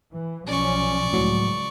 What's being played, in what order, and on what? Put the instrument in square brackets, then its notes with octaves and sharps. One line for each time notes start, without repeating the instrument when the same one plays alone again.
[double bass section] E3
[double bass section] B1 F3 C#4 [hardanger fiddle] D5 C#6
[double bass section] C#2 [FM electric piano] A2 F#3